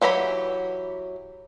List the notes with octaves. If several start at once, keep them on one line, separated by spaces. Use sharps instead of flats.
E3 F#3 G4 A#5 B5